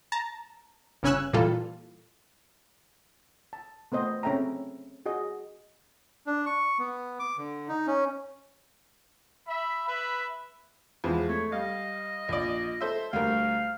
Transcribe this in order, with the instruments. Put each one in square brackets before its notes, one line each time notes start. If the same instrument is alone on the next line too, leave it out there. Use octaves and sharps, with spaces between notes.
[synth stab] A5 A#5
G1 C#3 C#4 G#5 E6 F#6
A#2 E3 G3 F4 A4
[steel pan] A5
A3 B3 C5 D#5
C4 C#4 A4 E5 G5 A#5
F#4 G#4 D#5
[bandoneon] D4
C#6
B3
D6
D3
D#4
C#4
[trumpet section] E5 B5
B4 E5 B5
[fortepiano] E2 F3 G#3
[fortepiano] A3 [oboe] C#5
[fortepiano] G3 F5 [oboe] D#5
[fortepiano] A#1 D5
A4 C5 E5
[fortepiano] D2 G3 A#4 [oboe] F5